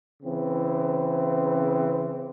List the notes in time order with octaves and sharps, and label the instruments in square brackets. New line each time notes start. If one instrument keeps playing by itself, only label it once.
[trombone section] C#3 E3 C4